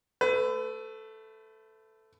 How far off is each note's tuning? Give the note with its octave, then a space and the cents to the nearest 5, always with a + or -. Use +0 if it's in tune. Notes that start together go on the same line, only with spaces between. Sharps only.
A3 +0 B4 +35